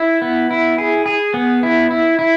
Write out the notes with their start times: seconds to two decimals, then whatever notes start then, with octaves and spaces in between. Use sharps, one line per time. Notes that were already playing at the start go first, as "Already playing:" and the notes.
Already playing: E4
0.22 B3
0.51 E4
0.78 G#4
1.06 G#4
1.34 B3
1.63 E4
1.91 E4
2.19 E4